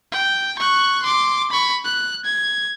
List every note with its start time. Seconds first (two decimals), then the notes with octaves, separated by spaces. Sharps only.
0.12 G5
0.59 C#6 F#6
1.03 C6 D6
1.51 B5 C#6
1.85 F#6
2.25 G#6